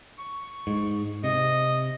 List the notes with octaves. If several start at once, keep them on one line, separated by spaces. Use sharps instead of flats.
C#6
G#2
C3 D#5